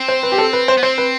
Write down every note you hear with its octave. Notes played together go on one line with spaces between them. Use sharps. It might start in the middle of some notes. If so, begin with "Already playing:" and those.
Already playing: C4
C5
B4
G4
A4
B4
C5
B3
C4 C5
B4